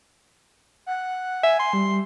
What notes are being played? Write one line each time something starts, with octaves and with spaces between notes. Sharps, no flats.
F#5
E5 G#5
C6
G3